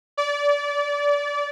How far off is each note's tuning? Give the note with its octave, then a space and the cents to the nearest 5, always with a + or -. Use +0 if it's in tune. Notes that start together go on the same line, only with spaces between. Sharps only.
D5 -25